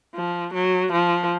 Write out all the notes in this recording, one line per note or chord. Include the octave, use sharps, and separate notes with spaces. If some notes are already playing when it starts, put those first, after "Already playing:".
F3
F#3
F3